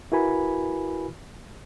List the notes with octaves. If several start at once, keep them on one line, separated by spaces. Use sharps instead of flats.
E4 F#4 A#4 B4 G#5 B5